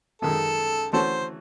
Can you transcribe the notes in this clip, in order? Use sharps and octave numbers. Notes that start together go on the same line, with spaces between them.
F#2 D#3 G#3 A4
E3 A3 C#4 F#4 A4 C5